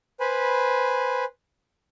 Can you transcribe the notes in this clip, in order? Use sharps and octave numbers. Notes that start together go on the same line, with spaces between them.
B4 C5 G#5 B5